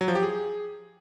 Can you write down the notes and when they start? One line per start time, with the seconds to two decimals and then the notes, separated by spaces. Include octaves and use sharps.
0.01 F#3
0.08 F3
0.15 G4
0.23 G#4